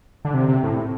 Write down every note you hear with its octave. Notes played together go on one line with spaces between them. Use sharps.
D3
C3
C3
A2